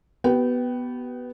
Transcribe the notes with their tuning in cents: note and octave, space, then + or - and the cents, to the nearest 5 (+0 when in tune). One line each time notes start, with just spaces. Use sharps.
B3 +0 G4 -45 G5 -20